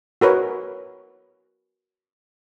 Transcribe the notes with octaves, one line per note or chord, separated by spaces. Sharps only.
F#4 A#4 B4 C#5